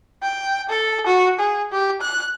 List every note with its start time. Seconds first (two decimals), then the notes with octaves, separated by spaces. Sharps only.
0.22 G5
0.69 A4
1.06 F#4
1.39 G#4
1.72 G4
2.01 F#6